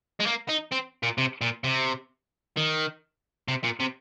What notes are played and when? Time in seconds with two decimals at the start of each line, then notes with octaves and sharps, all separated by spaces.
0.20 G#3
0.27 A#3
0.49 D#4
0.72 C4
1.03 A#2
1.18 C3
1.41 A#2
1.64 C3
2.57 D#3
3.48 C3
3.64 A#2
3.80 C3